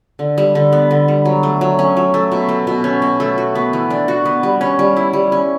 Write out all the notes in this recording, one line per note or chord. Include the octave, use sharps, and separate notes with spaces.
D3
G3
D3
B3
D3
G3
F#3
A3
F#3
C#4
F#3
A3
B2
A3
B2
C#4
B2
A3
F#4
B3
E3
D4
F#4
B3
G3
C#4
G3
E4
G3
C#4